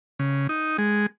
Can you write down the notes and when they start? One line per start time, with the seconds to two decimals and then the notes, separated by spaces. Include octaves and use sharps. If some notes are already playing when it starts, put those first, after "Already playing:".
0.19 C#3
0.49 D#4
0.78 G#3